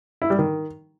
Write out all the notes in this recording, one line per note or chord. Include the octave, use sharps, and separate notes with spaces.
E4
G3
D#3